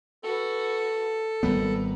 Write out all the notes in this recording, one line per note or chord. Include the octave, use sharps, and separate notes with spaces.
F#4 A4 B4
G#1 G3 B3 A#4 B4